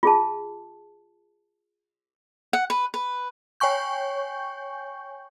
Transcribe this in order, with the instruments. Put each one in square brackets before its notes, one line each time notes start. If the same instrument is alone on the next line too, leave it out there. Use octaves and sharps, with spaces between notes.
[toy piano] F4 G#4 A5
[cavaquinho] F#5
B4
B4
[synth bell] C#5 G5 G#5 C#6 G6